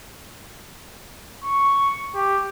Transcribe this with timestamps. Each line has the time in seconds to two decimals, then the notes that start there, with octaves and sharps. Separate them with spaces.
1.44 C#6
2.15 G4